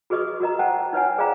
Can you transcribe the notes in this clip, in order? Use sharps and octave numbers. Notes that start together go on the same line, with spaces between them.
F#4 G#4 B4 D#5 C#6 D#6
F#4 A#4 D#5 A#5
C5 F#5 G5 A5
D#4 B4 C#5 F#5 G#5
G#4 C5 D5 F5 G5 A#5